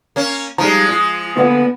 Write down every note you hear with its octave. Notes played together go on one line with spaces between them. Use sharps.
A#3 C#4
F3 G3 G#3 D#4 A#5
F4
D3 A#3 B3 F4